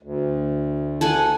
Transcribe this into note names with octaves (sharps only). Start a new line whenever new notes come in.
D2
A4 F#5 G#5